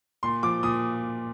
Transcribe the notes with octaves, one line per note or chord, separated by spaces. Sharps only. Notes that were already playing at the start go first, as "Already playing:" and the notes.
A#2 C6
F3 D6
A#2 D#6